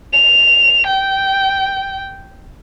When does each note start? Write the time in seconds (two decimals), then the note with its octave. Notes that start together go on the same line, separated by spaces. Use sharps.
0.13 F7
0.87 G5